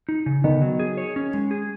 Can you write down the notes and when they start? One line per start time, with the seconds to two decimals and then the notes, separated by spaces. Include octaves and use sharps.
0.09 D#4
0.26 C#3
0.44 D#3 B3
0.62 F#3
0.79 G#4
0.98 C#5
1.16 C#4
1.34 G#3
1.51 G#4